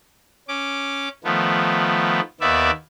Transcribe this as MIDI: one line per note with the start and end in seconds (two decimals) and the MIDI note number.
0.48 1.09 61
0.48 1.09 86
1.24 2.20 51
1.24 2.20 53
1.24 2.20 57
1.24 2.20 59
2.41 2.71 39
2.41 2.71 51
2.41 2.71 59
2.41 2.71 74
2.41 2.71 76